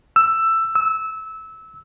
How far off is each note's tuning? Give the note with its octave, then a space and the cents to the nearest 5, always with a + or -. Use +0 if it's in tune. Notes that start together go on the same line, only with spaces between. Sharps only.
E6 +10
E6 -20